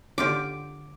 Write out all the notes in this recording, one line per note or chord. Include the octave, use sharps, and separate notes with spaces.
D3 F4 G4 D6